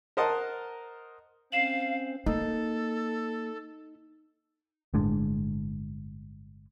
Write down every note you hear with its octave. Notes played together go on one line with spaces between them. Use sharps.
A#4 C5 D#5 F#5 A5
C4 C#4 C5 F5 C7 E7 F#7
A#3 D#4 A4
G1 A2 G#3 D4